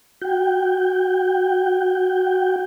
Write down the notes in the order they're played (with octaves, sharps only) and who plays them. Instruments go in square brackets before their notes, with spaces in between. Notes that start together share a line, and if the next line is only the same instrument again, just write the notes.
[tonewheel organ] F#4 G5